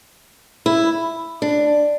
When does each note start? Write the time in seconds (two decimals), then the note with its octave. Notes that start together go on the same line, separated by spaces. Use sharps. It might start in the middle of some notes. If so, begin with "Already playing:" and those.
0.66 E4
1.42 D4